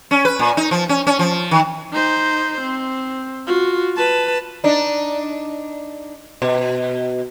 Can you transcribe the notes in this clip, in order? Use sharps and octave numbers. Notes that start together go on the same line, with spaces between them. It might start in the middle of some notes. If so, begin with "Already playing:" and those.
C#4
B4
A#2
D#4
F3
C#4
C#4
F3
D#3
D#4 C5
C4
F4 F#4
B4 A5
D4 D#4
B2